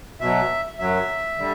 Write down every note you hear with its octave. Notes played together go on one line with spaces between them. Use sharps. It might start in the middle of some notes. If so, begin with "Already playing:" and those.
B2 F#3 E5
F#2 F#3 E5
D3 G3